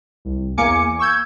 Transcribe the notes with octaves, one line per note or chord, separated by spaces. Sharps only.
C2
E2 A#3 G#5 D6 C#7
C#6 E6 G6 G#6